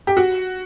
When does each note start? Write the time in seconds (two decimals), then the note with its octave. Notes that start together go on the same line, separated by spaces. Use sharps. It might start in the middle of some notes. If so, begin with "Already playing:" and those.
0.07 G4
0.17 F#4